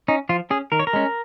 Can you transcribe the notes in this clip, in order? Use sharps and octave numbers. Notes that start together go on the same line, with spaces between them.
C#4 D#4
F3 F4
C#4 G#4
D#3 A#4
C#5
A#4
G#3 C#4